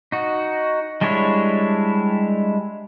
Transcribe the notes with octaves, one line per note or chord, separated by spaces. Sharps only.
D#4 F#4
G3 G#3 D4 E4 C#5